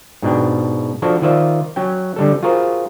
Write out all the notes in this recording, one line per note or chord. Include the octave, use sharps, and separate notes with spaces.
G#2 B2 D4 G5
F3 D4 F#4 A4
D#3 F4 C5 D5 E5
F#3 C#4 G5
D3 G3 A4
F4 F#4 G#4 A#4 C5